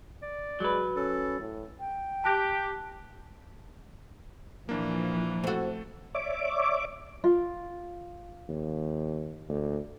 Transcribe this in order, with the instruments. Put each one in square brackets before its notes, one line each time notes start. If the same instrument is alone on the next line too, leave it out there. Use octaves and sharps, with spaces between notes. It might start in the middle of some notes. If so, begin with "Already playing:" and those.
[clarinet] D5
[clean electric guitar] F#3 B4 [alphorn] G#3
[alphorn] C#4 [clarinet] A4
[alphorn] A2
[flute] G5
[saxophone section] G4 [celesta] A5 F#6 A#6
[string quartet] A#2 E3 [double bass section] F3 [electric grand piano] A#3 D4
[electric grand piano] A3 A4 [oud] C4 F#4
[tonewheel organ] C#5 D5 E5 D6
[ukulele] F4
[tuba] D#2
D2